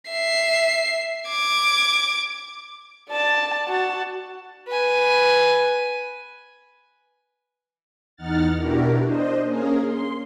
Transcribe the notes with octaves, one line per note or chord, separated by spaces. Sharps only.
E5 C7
D6 G#6
D5 A5
F#4 A5
B4 G#5
E2 D#4 F#5 F6 A6
B2 D4 E4 F#4 G4 A#4
D4 C5 D#5
A#3 C#4 G#4 A#4
C6